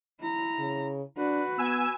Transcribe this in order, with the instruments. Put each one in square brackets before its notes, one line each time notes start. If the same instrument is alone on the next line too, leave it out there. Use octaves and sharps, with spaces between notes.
[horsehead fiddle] E4 A#5
[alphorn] C#3
[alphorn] D4 [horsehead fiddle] F#4 B4
[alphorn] B3 [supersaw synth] G#5 E6